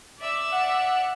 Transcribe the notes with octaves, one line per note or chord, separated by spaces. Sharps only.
D5 E5 E6
F#5